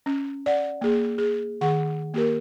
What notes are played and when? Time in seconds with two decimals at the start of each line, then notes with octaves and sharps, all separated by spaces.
0.06 C#4
0.46 D5 F#5
0.81 A#3 G#4
1.18 G#4
1.61 D#3 G#4 F#5 C#6
2.14 A#3 G4 A#4